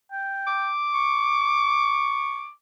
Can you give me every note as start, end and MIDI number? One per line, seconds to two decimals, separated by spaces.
0.12 0.70 79
0.47 2.50 86
0.94 2.48 85